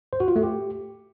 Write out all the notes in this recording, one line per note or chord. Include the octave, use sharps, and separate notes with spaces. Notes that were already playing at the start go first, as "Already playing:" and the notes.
C5
F#4
F4
A3
G4